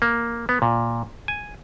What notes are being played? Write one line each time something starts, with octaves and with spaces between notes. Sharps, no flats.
A#3
B3
A#2
G#5